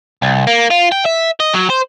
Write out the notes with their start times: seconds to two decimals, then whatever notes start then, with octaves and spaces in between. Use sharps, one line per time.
0.22 C2
0.47 A#3
0.71 F4
0.92 G5
1.06 E5
1.40 D#5
1.53 F#3
1.70 C5